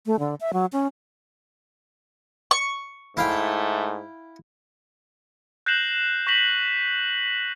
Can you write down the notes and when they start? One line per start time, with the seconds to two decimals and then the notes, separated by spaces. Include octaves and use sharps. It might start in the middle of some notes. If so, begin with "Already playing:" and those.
0.06 A3
0.19 D3
0.41 E5
0.53 F#3
0.73 C#4
2.51 C#6
3.17 G#2 A3 E4 F5 G5
5.66 F#6 G6 A#6 C7 E7 F#7
6.27 C#6 A#6 B6 F#7